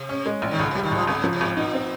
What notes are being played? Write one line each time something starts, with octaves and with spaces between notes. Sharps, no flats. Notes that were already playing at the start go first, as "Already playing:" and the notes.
Already playing: C3
C#4
G#3
A#1
D#3
C#2 C#3
C3
G3
D#3
C#2 F3
G#1 C#3
F3
C3
G#1
A#2 D#4
C4